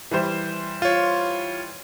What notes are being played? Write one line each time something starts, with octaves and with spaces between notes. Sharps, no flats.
E3 G3 C5
F4 C#5